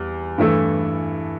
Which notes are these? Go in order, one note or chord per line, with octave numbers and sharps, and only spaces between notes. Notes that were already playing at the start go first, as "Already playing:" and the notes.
Already playing: E2 G3
G2 E3 A3 E4 A4